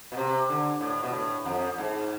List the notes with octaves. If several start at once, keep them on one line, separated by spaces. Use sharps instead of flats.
B2
C3
D3
A2
B2
A2
F2
G#2